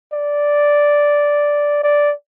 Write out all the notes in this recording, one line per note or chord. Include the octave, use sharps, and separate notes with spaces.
D5
D5